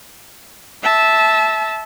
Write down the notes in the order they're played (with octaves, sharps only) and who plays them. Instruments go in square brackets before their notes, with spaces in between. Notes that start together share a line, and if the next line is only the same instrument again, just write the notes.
[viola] E5 A5